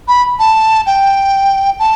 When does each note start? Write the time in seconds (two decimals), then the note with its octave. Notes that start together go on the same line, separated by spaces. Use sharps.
0.08 B5
0.39 A5
0.87 G5
1.79 A5